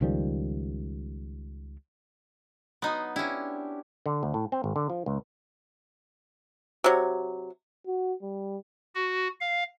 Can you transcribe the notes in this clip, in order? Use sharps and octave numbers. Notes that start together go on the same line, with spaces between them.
C#2 D#3 F3 G3
F#3 B3 D#4 C6
C#4 D4 E4 G4
D3
D2
A2
C4
G#1
D3
F3
C#2
C3 F#3
F#4
G3
F#4
F5